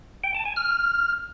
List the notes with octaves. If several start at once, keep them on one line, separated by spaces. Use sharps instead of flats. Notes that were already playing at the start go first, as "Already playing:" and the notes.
G5
A5
G#5
F6